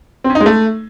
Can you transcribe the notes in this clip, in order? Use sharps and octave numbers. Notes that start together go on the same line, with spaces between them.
C4
C#4
D#4
G#3
A3